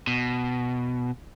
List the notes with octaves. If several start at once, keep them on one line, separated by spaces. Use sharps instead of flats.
B2